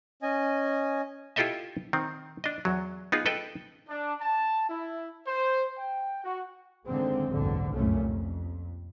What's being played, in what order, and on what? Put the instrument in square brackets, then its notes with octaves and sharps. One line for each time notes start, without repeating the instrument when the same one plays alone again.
[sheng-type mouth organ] C#4 D#5 G#5
[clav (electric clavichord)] E4 F4 G4 A4 D#5 E5
D#3 C4
D4 D#5
E2 F#3
B3 D#4 F4 G#4
A4 B4 D#5 G5
[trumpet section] D4
A5
E4
C5
G5
F#4
[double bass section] D3 D#3 G#3 A#3 C4
F#1 B1 E2 G#2 D3
F1 C2 F#2 A#2 A3 C#4
F2